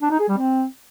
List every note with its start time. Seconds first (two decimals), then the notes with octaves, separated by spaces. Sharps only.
0.02 D4
0.11 D#4
0.19 G#4
0.28 G3
0.37 C4